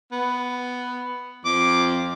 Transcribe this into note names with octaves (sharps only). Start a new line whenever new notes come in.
B3
F2 D6